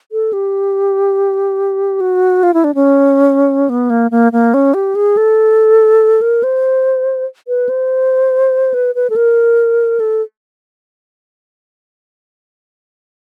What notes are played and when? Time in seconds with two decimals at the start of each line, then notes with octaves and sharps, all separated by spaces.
0.12 A4
0.33 G4
2.01 F#4
2.43 F4
2.54 E4
2.64 D4
2.75 C#4
3.69 B3
3.90 A#3
4.11 A#3
4.32 A#3
4.54 C#4
4.74 G4
4.95 G#4
5.17 A4
6.22 A#4
6.43 C5
7.48 B4
7.69 C5
8.74 B4
8.95 B4
9.10 A4
9.16 A#4
10.00 A4